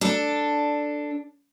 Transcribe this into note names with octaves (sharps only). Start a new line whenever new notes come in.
D4 A4